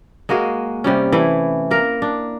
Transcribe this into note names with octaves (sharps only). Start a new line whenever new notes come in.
G#3 A#3 F#4 G#4
C3 G3 C#4
E3 A3 E4
A#3 A#4
D4